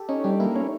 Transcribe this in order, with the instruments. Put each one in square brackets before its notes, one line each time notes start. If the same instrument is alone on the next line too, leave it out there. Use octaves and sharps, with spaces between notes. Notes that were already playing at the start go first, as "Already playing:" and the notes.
Already playing: [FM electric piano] G4 A4
[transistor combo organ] C#4 [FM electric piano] D#4
[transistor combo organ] G3 [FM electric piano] D4
[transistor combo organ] A#3 [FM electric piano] E4
[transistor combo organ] C#4